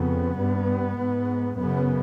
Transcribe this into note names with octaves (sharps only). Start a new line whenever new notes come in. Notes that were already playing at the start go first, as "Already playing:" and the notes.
Already playing: F2 C#3 B3
G2
G#2
F#2 C#3 B3